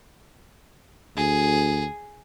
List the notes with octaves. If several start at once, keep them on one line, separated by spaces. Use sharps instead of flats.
D2 G#4